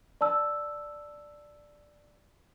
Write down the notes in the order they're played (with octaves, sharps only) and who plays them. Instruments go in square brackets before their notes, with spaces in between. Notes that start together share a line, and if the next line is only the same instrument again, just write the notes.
[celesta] D5 A5 E6